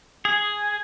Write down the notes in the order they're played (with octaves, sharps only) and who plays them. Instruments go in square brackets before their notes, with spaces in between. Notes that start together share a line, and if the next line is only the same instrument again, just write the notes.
[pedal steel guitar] G#4